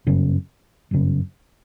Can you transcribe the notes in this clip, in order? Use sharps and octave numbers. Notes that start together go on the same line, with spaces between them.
G1 F#2 C#3
G1 F#2 C#3